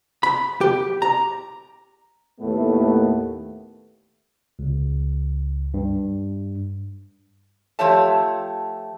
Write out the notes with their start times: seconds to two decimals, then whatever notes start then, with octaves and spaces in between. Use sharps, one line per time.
0.23 B5
0.61 G4
1.02 A#5
2.41 D#2 A2 A3 B3
4.59 C#2
5.74 G2
7.79 F3 A3 G4 C#5 E5 A5